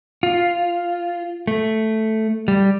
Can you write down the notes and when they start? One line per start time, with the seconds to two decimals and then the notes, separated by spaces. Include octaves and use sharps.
0.23 F4
1.47 A3
2.48 G3